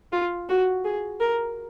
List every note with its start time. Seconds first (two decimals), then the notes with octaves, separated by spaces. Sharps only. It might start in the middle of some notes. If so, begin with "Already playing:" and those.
0.12 F4
0.49 F#4
0.85 G#4
1.20 A#4